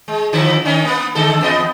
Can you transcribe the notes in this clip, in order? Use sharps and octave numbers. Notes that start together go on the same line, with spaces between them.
G#3
D3 F3 E4
D#3 C#4 D#4
A#3 B3
D3 G#3 A4
E2 B3 D#5